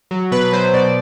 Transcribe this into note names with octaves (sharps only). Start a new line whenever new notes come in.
F#3
B2 B4
F#3 C5
B2 D5